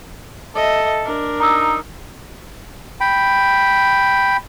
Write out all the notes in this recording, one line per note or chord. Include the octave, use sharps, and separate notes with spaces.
A4 D#5 E5
D4 A#4
D#4 A#5 E6
G5 B5